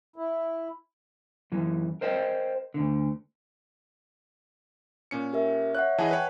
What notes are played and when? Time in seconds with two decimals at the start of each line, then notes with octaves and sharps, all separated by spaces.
0.16 E4
1.52 F#2 E3
2.01 A#4 C5 D#5 G5
2.74 D2 D3
5.11 A#2 C#4 C#7
5.33 G4 A#4 E5
5.75 C#5 E5 F#5 F#6
5.98 E3 G#4 D#5 F#5 G#5 A5
6.11 B4 C#5 G5